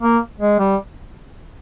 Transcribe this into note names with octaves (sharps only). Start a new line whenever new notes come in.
A#3
G#3
G3